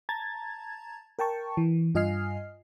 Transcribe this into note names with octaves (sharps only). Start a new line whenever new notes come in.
A5 A#5 G#6 A6
A#4 G5 A5 C#6
E3
G2 F4 D#5 G#5 F6 C7